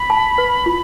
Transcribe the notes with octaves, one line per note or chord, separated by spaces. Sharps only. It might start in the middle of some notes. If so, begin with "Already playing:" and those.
Already playing: B5
A5
B4
F4